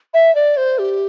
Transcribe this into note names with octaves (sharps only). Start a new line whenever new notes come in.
E5
D5
C5
G4